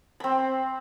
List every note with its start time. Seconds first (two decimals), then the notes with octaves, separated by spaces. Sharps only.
0.20 C4 B5